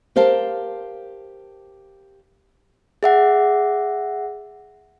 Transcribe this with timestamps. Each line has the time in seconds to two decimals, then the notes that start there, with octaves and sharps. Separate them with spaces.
0.16 G4 A#4 C5 F5 A5
3.03 G#4 E5 F#5